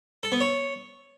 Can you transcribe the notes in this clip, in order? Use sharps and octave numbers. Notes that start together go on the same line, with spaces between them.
A4
B3
C#5